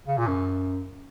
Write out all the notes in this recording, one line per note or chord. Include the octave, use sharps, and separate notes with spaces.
C#3
A#2
F#2